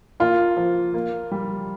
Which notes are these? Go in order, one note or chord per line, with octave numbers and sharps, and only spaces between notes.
A#3 F4
F3
A#3
G3